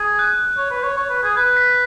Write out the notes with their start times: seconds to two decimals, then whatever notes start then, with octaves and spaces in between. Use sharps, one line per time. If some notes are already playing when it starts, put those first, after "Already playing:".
Already playing: G#4
0.19 F#6
0.58 C#5
0.71 B4
0.84 C#5
0.97 C#5
1.10 B4
1.23 G#4
1.37 B4 F#6
1.57 B6